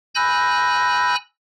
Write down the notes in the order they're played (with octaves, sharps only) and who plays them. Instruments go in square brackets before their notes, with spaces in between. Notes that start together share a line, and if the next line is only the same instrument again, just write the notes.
[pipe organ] G#5 B5 E6 F#6 G6 A#6